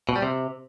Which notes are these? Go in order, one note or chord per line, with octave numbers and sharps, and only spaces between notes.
B2
G3
C3